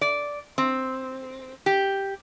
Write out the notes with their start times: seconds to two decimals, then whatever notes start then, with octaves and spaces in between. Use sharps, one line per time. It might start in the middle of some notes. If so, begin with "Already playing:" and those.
0.01 D5
0.58 C4
1.66 G4